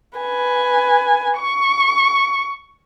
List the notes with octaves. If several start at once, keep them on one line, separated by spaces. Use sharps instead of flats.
B4 G#5
C#6